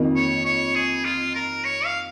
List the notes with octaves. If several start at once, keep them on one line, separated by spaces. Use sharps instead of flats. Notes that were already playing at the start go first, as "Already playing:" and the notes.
Already playing: F2 D#3 A#3
C#5
C#5
G#4
F4
A#4
C#5
F5